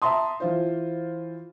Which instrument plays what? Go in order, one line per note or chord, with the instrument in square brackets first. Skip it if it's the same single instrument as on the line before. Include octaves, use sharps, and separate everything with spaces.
[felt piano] E5 A5 A#5 C6 D#6
E3 F4 C5